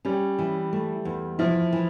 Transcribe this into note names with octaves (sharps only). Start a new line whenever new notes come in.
G3 C#4
E3
A3
E2
F3 E4
E3